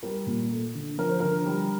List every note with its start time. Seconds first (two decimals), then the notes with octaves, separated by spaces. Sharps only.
0.03 G3 A#4
0.26 A#2
0.51 A3
0.75 D3
0.98 F3 A#4
1.09 C5
1.20 D3 A#4
1.46 G3